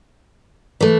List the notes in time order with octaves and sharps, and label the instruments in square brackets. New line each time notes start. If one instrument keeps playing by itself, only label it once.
[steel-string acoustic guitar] E3 A3